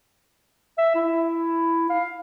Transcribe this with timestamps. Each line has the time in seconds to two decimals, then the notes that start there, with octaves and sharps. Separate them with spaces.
0.78 E5
0.95 E4
1.90 F5